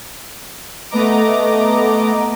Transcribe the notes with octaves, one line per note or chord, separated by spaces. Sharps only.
A3 B3 D#5 A#5 D6